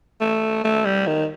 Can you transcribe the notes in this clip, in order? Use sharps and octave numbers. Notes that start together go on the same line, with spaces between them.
A3
A3
G3
D#3